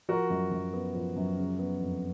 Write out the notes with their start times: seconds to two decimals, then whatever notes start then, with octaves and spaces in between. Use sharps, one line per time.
0.09 F3 F#4 A#4
0.30 F#2
0.51 F#2
0.73 B3
0.94 F3
1.16 F#2
1.37 C#3
1.59 B3
1.81 F2